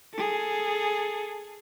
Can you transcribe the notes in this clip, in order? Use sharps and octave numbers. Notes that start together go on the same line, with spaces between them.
G#4 A4